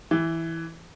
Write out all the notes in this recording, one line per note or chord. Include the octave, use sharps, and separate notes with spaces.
E3